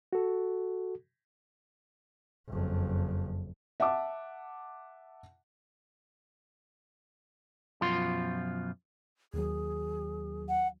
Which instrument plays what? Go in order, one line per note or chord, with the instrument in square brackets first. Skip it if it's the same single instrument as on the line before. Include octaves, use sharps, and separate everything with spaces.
[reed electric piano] F#4 A4
[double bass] F#1 F2
[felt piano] E5 F#5 A5 D6
[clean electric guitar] F#2 B2 F3 F4 C6
[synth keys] D#2 D#3 F#3 [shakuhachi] G#4
[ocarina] F#5